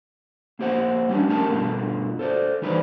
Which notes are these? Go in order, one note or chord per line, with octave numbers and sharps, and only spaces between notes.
A#3 G4 C5 F#5
G3 C#4 D4 G4
A3 C#4 G4 A4 A#4 A5
G2 B2 A3 F4
A4 C5 D5
E3 G3 D#4 B4 C5 D5